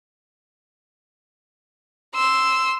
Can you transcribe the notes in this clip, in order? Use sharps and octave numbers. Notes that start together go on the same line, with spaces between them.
C6 E6